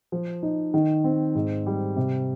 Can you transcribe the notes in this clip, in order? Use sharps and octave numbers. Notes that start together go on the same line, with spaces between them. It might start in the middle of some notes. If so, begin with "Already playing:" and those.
F3
D#4
D#3
C4
G#2
G3
C3